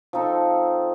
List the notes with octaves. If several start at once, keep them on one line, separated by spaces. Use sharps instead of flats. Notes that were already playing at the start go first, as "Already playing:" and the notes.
F3 C4 D#4 A4